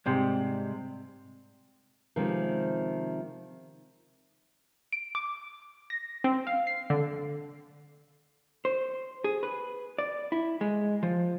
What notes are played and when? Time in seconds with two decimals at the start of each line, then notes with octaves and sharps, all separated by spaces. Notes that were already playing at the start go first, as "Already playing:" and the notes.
0.06 G#2 C3 G3
2.16 C3 D#3 F3 G#3 C4 C#4
4.92 D7
5.15 D6
5.90 A#6
6.24 C4
6.47 F5
6.67 C7
6.90 D3
8.65 C5
9.24 G#4
9.43 B4
9.98 D5
10.32 E4
10.61 G#3
11.03 F3